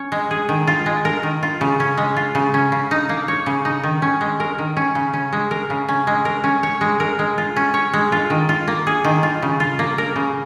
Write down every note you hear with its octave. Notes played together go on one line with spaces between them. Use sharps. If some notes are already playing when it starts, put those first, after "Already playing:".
Already playing: C#4 C#5
G#3
G#4
D#3
F4
G#3
A#4
D#3
F4
C#3
C#4
G#3
F4
C#3
C#4
C#3
D#4
A#3
C#5
C#3
D#4
D#3
C#4
G#3
A#4
D#3
C#4
C#3
C#4
G#3
A#4
C#3
C#4
G#3
A#4
C#4
C#5
G#3
A#4
G#3
F4
C#4
C#5
G#3
F4
D#3
F4
A#3
G#4
D#3
F4
C#3
F4
A#3
A#4
C#3